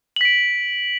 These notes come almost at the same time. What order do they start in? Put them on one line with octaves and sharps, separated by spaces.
F#7 B6 D7